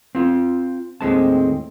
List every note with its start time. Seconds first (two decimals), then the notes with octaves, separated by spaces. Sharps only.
0.15 C4 F4
1.01 D#2 A2 D#3 G#3 C4 A5